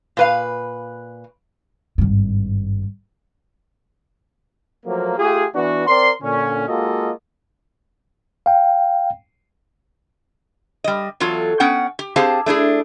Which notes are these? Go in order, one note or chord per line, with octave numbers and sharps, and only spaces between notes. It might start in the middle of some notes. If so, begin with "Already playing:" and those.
A#2 B4 F5
G#1 G2
F3 F#3 A3 A#3
A3 F4 G4 G#4
E3 B3 D4 E4 F#4
C4 A#4 D5 C6
A#2 D3 C#4
G#3 A#3 F4 F#4 A4 D#5
F5 G5
G3 D#5
E2 F#3 F4 A4
B3 C#4 F#5 G5
G4
C4 G4 G#4 C5 F5 A5
A3 D4 E4 G#4